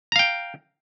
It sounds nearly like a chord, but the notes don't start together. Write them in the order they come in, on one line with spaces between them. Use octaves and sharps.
A#5 F5 G5